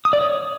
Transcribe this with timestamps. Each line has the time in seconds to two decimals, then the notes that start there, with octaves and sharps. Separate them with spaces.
0.05 D#6
0.13 D5
0.21 C#5